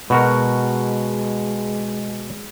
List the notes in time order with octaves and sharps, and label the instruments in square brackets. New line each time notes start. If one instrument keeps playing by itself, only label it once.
[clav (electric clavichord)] B2 F#4 A#4 [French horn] G#3